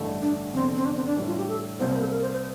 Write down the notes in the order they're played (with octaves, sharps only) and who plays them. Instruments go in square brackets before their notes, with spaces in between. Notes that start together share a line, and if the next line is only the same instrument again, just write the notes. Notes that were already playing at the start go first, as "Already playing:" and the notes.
Already playing: [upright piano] A1 G2 D3 A3
[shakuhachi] D4
[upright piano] F1 E2 D3 [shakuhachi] C4
[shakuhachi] C4
D4
C4
D4
[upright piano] A2 E3 G3 D4
[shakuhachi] F4
G4
A4
[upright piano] C2 C3 G3 A#3 [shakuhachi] C5
[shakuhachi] C5
A4
A#4
C5
C5